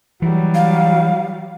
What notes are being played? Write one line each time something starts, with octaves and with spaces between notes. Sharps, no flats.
E3 F#3 G3
F5